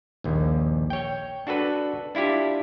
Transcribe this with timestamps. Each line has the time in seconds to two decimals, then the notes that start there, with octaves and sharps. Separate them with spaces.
0.24 A#1 D#2
0.90 C#5 G5
1.47 D4 F#4 A4 B4
2.15 D4 E4 F4 G4